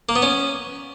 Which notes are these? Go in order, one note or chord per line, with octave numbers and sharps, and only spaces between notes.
A#3
B3
C#4